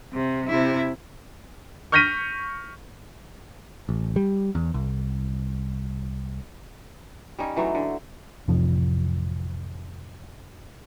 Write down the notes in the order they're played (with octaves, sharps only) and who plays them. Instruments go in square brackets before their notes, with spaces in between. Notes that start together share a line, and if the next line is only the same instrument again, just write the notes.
[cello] C3
C3 E4
[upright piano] C#6 F6 G6 A#6 B6 D#7
[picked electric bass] A1
G3
E2
C2
[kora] G3 C#4 D#4
E3 F#3 A3 D#4
D3
[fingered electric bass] A1 F2 C3 F3